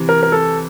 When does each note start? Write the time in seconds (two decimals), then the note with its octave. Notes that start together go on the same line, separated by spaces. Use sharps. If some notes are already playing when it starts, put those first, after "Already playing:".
Already playing: C3 E3
0.09 A#4
0.23 A#4
0.32 A4